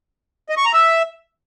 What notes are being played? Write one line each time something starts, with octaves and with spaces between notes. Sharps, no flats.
D#5
C#6
A#5
E5